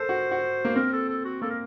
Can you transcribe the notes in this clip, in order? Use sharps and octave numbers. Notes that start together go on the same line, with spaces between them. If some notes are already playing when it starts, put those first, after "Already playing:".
Already playing: A4 A#4 C5
F#4
F#4
A#3
C4 A#4
A4
A4
F#4
A#3 A4
A#4